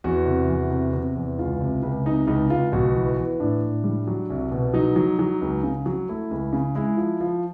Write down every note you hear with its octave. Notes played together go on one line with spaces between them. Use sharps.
E2 F#4
C3
E2
C3
C3
E2
C#2 F4
C3
C#2
C3 D#4
C#2 D#4
C#2 F4
B1 F#4
E3
E3
A2 D4
A2
G3
F#3
C2
B2
F#3 D#4
F#3
F#3
C#2
C#3
F#3
A3 E4
C#2
C#3
G#3 E4
F3
F3